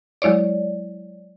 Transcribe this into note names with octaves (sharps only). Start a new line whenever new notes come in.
F#3 G#3 E4 C#5 D5